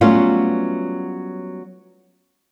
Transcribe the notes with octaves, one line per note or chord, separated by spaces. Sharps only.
F#3 G3 A3 B3 C#4 F4